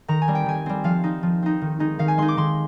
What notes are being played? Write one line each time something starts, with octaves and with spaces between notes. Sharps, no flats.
D#3 A#5
G#5
G3 C4
G5
D#3 G#5
G3 C4
F3 F5
C4 D#4
F3
C4 D#4
D#3
G#3 D#4
D#3 F5
G#5
G#3 D#4 C6
D6
D#3 C6